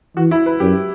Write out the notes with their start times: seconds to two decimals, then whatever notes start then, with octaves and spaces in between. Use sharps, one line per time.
0.17 E3 F#4
0.31 E4
0.46 B4
0.60 F#2 G4